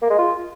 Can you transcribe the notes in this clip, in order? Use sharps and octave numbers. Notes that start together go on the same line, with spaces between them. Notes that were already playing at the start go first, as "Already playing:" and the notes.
A#3
G#3
F4